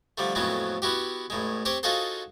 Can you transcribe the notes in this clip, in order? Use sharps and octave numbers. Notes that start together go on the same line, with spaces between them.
D3 F3 G3 A3
F2 A2 F#3 G#3 B3 C4
B3 E4 F#4 G4
A1 A2 G#3
C4 G4 C5 C#5
D#4 F4 F#4 G#4 A4 C5